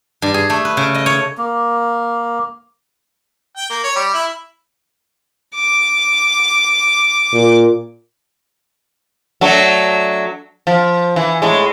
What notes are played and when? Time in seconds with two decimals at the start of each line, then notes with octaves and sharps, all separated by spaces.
0.22 G2
0.34 G#4
0.50 A3
0.65 B4
0.77 C#3
0.95 D#5
1.06 C#5
1.38 A#3
3.57 G5
3.70 A#3
3.84 C#5
3.96 G3
4.14 E4
5.55 D6
7.34 A#2
9.41 F#3 A3 D4
10.67 F3
11.16 E3
11.42 A2 G#3